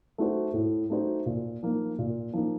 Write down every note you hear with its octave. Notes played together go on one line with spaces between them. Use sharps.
A3 D#4 F#4 C5
A2
A3 D#4 F#4 C5
A#2
F3 A#3 D#4
A#2
F3 A#3 D#4